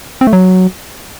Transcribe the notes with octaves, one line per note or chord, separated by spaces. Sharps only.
C4
A3
F#3